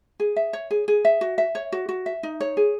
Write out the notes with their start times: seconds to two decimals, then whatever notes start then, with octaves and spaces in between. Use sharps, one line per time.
0.20 G#4
0.36 E5
0.53 C#5
0.71 G#4
0.88 G#4
1.05 E5
1.21 F#4
1.38 E5
1.55 C#5
1.72 F#4
1.89 F#4
2.06 E5
2.23 D#4
2.40 C#5
2.57 G#4